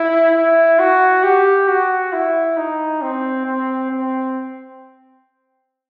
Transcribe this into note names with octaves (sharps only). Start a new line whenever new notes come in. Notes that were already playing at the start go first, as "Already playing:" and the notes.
Already playing: E4
E4
F#4
G4
F#4
E4
D#4
C4
C4
C4